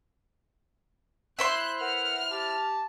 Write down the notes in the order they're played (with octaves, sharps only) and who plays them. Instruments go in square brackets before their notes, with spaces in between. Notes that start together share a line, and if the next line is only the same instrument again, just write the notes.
[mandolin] E4 C5 C6 [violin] F#6
[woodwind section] A#4 B4 F#5 [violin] F6
[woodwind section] G4 A5